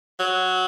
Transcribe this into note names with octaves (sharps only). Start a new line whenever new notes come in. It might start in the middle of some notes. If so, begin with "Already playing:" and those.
F#3